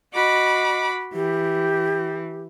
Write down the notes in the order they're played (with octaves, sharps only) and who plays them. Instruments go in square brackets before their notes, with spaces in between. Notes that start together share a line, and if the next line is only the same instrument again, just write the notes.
[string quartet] F#4 B5 D6 [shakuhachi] D#5
[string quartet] E3 [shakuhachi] G4